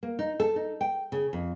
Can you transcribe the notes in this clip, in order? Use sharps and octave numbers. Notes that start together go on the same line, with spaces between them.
A#3
D#4
A4
D#4
G5
C#3
F2